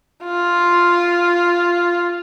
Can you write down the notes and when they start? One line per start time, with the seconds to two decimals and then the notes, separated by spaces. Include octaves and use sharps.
0.24 F4